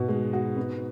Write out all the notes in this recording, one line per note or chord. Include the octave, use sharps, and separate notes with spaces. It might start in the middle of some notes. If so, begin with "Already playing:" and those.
Already playing: G#2 B2 B3
G#3
F#4
B3